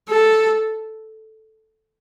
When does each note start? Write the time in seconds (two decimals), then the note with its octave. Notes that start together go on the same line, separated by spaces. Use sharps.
0.10 A4